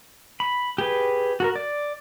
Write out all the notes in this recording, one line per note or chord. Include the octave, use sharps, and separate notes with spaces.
B5
G4 G#4 B4
F#4 A4 A#4
D5